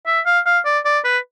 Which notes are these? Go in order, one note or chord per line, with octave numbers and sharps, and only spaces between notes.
E5
F5
F5
D5
D5
B4